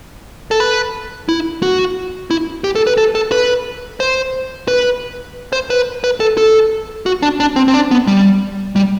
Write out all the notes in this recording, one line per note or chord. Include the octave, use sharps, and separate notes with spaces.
A4
B4
E4
F#4
E4
G4
A4
B4
A4
A4
B4
C5
B4
C5
B4
B4
A4
A4
F#4
D4
D4
C4
C4
D4
B3
G3
G3